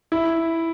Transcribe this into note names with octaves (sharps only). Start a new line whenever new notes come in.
E4